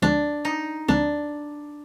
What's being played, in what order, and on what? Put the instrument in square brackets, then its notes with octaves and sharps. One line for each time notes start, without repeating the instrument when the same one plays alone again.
[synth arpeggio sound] D2 D3 F3 G#3 C4 [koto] D4
[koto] D#4
[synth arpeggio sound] D2 D3 F3 G#3 C4 [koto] D4